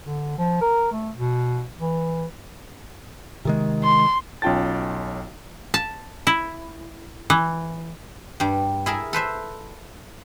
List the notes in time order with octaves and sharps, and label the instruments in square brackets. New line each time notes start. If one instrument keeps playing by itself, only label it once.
[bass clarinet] D3
F3
A#4
A3
B2
E3
[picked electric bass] C3 D#3 G#3
[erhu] C6
[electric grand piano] B1 C#4 F4 G5 A5 A6
[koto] A5
E4
E3
[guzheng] G2 G3
E4 G#4 A#4 E5
A4 B4 C5 E5